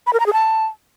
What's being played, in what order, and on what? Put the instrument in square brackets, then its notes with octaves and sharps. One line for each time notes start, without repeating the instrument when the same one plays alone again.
[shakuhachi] B5
A#4
A#5
G#4
A5